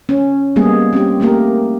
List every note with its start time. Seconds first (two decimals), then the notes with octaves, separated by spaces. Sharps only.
0.09 C#4
0.56 G3 G#3 A#3 B3 G#4
0.93 C4 C#4 G4
1.20 A3 A#3 G4 A#4